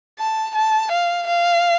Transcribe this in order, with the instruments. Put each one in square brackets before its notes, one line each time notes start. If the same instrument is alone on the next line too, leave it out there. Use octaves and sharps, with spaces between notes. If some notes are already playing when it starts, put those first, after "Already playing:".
[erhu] A5
A5
F5
F5